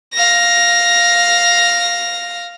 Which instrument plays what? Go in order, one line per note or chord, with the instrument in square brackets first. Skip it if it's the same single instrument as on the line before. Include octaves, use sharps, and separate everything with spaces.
[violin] F5 A#6